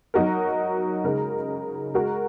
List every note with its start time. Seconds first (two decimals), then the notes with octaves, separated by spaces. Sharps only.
0.14 F#3 D#4 F#4 A#4
1.04 C#3 G#3 D#4 A#4
1.94 G#3 F#4 A#4